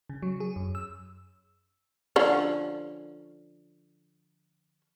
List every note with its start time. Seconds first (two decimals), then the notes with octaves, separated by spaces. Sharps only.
0.10 C#3
0.22 F#3
0.40 G#4
0.56 F#2
0.75 E6
2.16 D3 F3 C#4